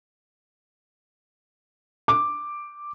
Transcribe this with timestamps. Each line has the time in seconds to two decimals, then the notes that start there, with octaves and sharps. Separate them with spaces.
2.08 D6